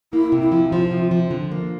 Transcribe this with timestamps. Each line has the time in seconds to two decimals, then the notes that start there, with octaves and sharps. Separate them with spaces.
0.13 A#3 E4
0.32 C3
0.42 E4
0.52 F3
0.72 F3 F4
0.91 C3
1.11 F3
1.31 D3
1.51 A#3